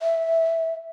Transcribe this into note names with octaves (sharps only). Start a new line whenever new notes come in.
E5